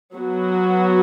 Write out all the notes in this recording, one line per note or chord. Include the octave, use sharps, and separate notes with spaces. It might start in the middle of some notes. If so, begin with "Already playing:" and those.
F#3 B3 F#4